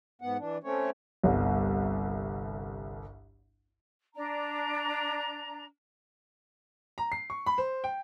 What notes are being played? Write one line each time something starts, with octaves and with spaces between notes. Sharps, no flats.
G#2 B3 F#5
E3 D4
A3 C4 C#4 C#5
G1 C2
D4 A#5
A#5
C7
C#6
B5
C5
G5